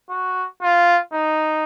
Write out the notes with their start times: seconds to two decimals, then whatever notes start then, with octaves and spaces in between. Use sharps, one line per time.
0.10 F#4
0.62 F4
1.13 D#4